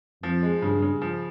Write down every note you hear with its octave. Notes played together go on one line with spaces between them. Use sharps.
F2 F3
G#3
G2 C#3
C#3
F3